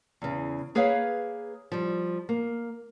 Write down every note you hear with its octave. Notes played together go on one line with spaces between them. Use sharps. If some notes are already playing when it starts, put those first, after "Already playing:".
E2 C#3
A#3 G#4 B4 C#5 F5
F3 G3
A#3